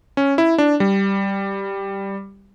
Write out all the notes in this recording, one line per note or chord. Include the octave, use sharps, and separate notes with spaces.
C#4
E4
D4
G3